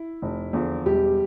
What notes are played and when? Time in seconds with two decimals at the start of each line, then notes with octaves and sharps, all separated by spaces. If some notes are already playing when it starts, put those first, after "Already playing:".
Already playing: E4
0.22 F1
0.53 E2 D3 F3
0.85 E1 G3 G4